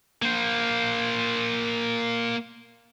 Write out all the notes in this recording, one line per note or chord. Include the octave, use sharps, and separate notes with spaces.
A#3 C5